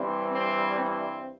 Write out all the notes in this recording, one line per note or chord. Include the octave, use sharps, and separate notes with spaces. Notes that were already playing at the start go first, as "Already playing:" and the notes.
Already playing: G2 E3 G3 C4
C4
C4